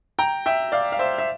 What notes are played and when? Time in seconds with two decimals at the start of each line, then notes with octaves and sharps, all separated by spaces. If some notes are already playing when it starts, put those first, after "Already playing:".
0.19 G5 A#5
0.46 E5 G5
0.72 D5 F5
0.92 F5
0.99 C5 E5
1.18 E5